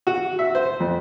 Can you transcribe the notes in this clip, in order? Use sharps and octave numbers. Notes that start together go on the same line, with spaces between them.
F#4
E5
C5
F2